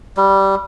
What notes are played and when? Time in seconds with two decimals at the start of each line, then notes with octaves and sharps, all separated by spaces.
0.17 G3